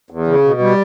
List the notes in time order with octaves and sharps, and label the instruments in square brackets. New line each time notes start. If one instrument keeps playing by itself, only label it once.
[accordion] E2
C#3
B2
G3